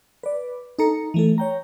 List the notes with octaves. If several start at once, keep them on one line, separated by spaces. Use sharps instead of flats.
B4 D5
D#4 A4 A#5 C#7
E3 A3 A4
C#5 G5 A#5